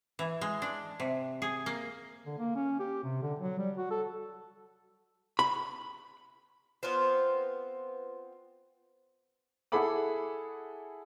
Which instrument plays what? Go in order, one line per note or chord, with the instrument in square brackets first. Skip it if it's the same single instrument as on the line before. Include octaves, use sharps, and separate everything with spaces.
[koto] E3
G#3
D4
C3
G#4
A#3
[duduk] D3
A#3
C#4
G4
C3
D3
F#3
G3
F#4
A4
[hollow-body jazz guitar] B5
[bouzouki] B3 C4 F4 C5
[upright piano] E4 G#4 A4 F#5 B5 D6